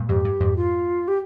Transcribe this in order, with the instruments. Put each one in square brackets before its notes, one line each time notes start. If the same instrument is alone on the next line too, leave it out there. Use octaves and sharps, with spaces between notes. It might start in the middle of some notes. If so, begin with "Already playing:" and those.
Already playing: [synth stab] G2 A#2
[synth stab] F2 G#2 [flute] G4
[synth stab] G2
F2 G#2
[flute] F4
G4